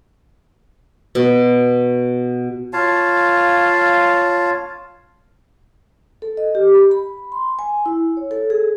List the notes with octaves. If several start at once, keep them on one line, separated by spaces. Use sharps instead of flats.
B2
F4 C#5 F5 A5
A4
D#5
G4
B5
B5
C6
G#5
E4
C#5
A4
G#4